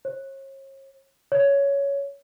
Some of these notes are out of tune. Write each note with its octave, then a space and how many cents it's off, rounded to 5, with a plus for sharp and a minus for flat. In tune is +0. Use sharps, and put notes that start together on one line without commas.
C#5 -40
C#5 +10